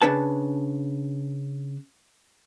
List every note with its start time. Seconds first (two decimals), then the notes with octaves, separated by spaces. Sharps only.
0.02 C#3 D4 B4 A5